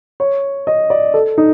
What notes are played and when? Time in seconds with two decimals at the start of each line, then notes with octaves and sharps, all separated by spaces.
0.20 C#5
0.67 D#5
0.90 D5
1.14 A4
1.38 D#4